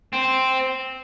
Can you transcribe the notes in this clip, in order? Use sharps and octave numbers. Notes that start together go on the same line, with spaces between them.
C4